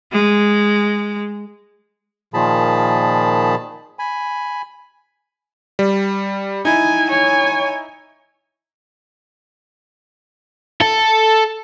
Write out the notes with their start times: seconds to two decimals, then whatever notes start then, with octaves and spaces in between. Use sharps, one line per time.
0.13 G#3
2.34 A#2 D#3 F3 G#4 A5 B5
3.99 G#5 B5
5.79 G3
6.65 D#4 E4 G#5
7.09 C#5 G#5
10.81 A4